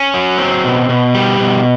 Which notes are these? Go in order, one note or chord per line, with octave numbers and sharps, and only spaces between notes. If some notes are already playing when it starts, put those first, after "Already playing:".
Already playing: C#4
F#3
C4
B2
B2
G3
B2